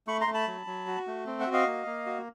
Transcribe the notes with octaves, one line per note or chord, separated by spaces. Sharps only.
A3 B5 C#6
A#5 C6
A3
A5 B5
F#3
F#3
F#4
A3
C4
E5 F#5
F#4
D#5 F5
A#3
A#3
F#4